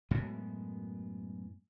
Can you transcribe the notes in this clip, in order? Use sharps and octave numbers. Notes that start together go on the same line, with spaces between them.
F#2 A2 G#3 B3